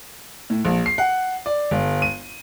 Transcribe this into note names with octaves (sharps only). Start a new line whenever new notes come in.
A2
A#1
C7
F#5
D5
G1
D#7